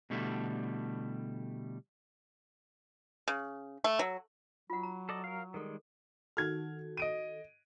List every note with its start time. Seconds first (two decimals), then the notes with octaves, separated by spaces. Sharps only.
0.10 B2 D3 G3 A3 E4
3.28 C#3
3.84 A3
3.99 F#3
4.70 F#3 F4 F#5
4.83 A#5
5.09 A4 D5 D#5
5.24 A#4 F5
5.54 D#3 G3 G#3 A4 A#4
6.37 D#3 F#4 A4 F6 G#6
6.97 D#5 D7 D#7